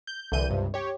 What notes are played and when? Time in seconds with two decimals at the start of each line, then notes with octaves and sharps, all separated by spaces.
0.07 G6
0.32 C2 D3 E3 G6 D#7
0.49 C#2 G2 C3
0.74 G4 C#5